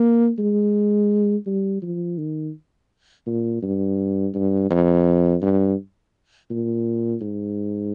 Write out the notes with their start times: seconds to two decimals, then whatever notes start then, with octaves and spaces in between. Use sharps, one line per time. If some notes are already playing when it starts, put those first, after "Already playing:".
Already playing: A#3
0.39 G#3
1.46 G3
1.82 F3
2.18 D#3
3.26 A#2
3.62 G2
4.34 G2
4.70 F2
5.42 G2
6.50 A#2
7.21 G#2